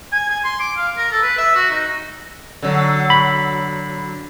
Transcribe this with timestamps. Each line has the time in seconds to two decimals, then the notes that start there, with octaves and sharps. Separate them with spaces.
0.12 G#5
0.29 G#5
0.44 C6
0.60 D6
0.76 F5
0.97 A#4
1.11 A4
1.22 B4
1.38 E5
1.55 F#4
1.70 D#4
2.63 D3 F#3
3.10 B5